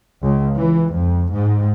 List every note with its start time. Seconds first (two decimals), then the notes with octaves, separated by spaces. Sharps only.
0.23 C#2
0.56 E3
0.92 F2
1.32 G#2